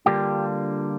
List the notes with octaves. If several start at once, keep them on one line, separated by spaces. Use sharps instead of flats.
D3 G3 A#3 D4 F4 G4